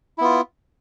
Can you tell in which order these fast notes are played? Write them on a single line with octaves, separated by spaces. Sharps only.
E4 B3 F4